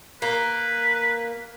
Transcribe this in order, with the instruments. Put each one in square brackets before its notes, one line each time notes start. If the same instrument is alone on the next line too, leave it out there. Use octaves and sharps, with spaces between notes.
[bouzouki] A#3 [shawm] B4